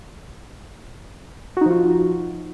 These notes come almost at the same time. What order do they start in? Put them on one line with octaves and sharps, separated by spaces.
F#4 D#4 F3 F4